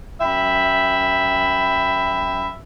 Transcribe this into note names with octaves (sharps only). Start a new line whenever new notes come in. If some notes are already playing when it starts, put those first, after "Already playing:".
F#2 E5 G5 B5